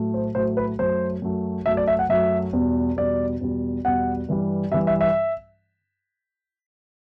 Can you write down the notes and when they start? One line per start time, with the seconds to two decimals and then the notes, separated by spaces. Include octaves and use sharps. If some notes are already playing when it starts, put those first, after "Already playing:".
Already playing: A2 F#3 A3
0.14 C5
0.35 A2 F#3 A3 C5
0.57 B4
0.79 F#2 F#3 A3 C5
1.22 F#2 F#3 A3
1.66 F#2 F#3 A3 E5
1.77 D5
1.87 E5
1.99 F#5
2.09 F#2 F#3 A3 E5
2.53 E2 B2 G3
2.97 E2 B2 G3 D5
3.41 E2 B2 G3
3.85 E2 B2 G3 F#5
4.29 G2 E3 G3
4.71 G2 E3 G3 E5
4.87 E5
5.01 E5